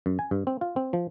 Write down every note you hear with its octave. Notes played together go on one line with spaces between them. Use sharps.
F#2
G#5
G2
C4
F4
C4
F3